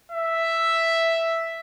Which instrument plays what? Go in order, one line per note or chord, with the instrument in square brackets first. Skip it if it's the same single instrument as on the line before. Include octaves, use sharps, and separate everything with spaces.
[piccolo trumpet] E5